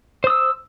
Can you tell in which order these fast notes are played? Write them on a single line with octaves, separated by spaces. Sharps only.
C5 D#6 E6